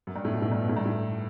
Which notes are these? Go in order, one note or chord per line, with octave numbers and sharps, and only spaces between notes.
F#2
G2
A2
B2
A2
G2
B2
A2
G2
A2